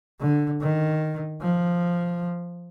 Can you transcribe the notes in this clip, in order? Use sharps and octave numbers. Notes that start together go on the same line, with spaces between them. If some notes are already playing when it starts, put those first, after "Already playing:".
D3
D#3
F3